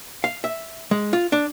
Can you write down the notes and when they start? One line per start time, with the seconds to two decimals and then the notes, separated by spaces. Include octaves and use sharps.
0.24 F5
0.44 E5
0.91 G#3
1.13 F4
1.32 D4